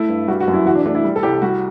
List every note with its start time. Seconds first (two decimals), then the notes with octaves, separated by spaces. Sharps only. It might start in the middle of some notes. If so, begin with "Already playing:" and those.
Already playing: A3 E4
0.09 G2
0.28 G3 F#4
0.41 F#4
0.48 F#2
0.53 E4
0.66 E3 F#4
0.75 D4
0.86 A3 D4
0.95 E4
1.04 G3
1.16 A4
1.23 C2 G4
1.42 G3 F#4